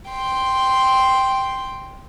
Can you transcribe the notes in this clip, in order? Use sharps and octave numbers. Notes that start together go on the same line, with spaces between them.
G5 C6